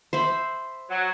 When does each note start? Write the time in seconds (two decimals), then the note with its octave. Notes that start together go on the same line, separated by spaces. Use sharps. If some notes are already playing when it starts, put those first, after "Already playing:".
0.13 C5 E5 B5
0.90 F#3